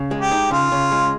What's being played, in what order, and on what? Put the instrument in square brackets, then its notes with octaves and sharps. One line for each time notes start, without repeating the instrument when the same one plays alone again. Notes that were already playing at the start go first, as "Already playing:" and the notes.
Already playing: [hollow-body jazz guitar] C#3
G#3
[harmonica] G4
[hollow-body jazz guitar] D#4
[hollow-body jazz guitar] C#3 [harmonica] F4
[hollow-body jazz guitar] C#3
G#3